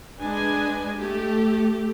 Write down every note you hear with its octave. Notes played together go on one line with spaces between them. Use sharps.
G#3 D4 B4 D#5 G#5
A3 G4